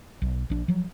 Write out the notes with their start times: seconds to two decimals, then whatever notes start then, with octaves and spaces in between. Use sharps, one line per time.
0.22 B1
0.50 A#1 D4
0.68 F3 F#3